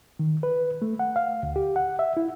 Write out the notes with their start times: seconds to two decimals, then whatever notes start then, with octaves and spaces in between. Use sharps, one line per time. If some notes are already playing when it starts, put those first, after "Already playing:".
0.19 D#3
0.43 B4
0.82 A3
0.99 F#5
1.16 F5
1.43 D2
1.56 G4
1.76 F#5
1.99 E5
2.17 E4